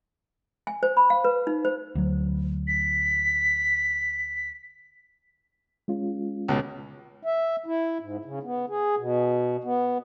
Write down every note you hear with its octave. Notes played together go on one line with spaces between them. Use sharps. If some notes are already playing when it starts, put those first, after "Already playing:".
G#5
C5
B5
F5
B4
D#4
C5
D2 F#3
B6
G#3 C#4 F4
C#2 B2
E5
E4
G#2
C#3
B3
G#4
B2
B3